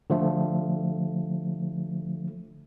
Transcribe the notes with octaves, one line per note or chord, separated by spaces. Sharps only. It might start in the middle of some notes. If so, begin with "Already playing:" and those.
D3 F3 A3